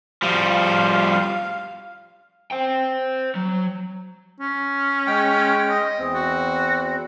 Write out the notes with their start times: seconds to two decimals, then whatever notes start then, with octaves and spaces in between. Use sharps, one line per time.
0.22 F3 G3 F5
2.51 C5 G5
3.35 F#3
4.40 C#4
5.07 G#3 G5
5.69 D#5
5.99 E2 C4
6.15 F#4